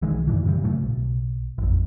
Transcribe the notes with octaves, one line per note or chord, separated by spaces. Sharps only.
B1 D#3 E3 G#3
F#2 A2 D3 E3
F#2 C#3 E3 G3
A2 C#3 F#3 A3
B1
A1 F2